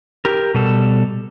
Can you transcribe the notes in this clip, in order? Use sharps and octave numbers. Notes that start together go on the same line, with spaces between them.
G4 A#4
B2 G3 A4